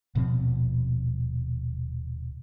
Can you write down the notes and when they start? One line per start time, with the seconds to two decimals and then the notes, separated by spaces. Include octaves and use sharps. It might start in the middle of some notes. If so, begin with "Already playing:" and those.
0.15 D#1 B2 F3 C4